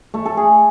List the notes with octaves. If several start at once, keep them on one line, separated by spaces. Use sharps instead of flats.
A3
A4
G#4